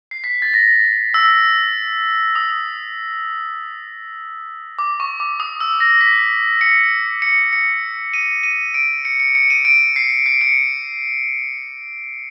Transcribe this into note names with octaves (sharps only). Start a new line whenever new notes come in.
C7
B6
A6
A#6
E6
D#6
D6
C#6
D6
D#6
E6
A#6
B6
C#7
C#7
C#7
D#7
D#7
D7
C#7
C#7
C#7
D#7
D7
C7
C7
C#7